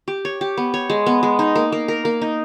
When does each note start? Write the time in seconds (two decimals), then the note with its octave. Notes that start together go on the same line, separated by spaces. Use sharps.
0.08 G4
0.25 C#5
0.41 G4
0.57 B3
0.74 C#5
0.90 G#3
1.06 B3
1.23 G#3
1.39 D#4
1.56 A#3
1.72 A#3
1.88 A#4
2.05 A#3
2.22 D#4